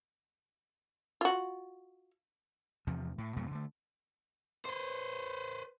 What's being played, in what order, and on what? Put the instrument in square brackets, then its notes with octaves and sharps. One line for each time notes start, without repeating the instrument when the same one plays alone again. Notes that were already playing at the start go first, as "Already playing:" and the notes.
[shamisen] F4 F#4
[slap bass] E2 C3 F3
A2
F2 B2 G#3 B3
D3 A3
[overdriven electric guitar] B4 C5